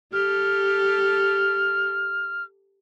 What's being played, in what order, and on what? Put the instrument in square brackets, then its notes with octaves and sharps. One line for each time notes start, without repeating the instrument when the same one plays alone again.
[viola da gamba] G4 A4 [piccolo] F6